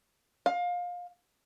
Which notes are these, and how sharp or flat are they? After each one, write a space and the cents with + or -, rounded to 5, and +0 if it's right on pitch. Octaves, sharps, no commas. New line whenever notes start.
F5 +25